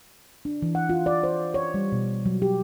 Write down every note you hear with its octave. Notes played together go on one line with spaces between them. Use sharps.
D4
E3
F#5
F4
D5
C5
C#5
G3
B2
F#3
G4